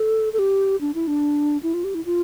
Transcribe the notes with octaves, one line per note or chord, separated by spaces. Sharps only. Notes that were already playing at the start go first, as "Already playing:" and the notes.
Already playing: A4
A4
G4
D4
E4
D4
E4
F4
G4
E4
F4